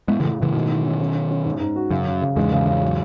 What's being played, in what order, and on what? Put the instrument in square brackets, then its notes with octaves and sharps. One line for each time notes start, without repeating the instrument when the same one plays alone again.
[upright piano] A2 [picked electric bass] G#3 B3
[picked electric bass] C#3 E3
[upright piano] A2
[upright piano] A2 [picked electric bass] C#3 E3
[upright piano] G#2 [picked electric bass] B2 D#3
[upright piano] E3
C#4
C#4
C#4
C#4
G#2
G#2
F#4
[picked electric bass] F#2 [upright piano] C#3
[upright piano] C#3
C#3
[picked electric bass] E2 G#2 [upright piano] G#3
[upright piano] C#3
C#3
F#3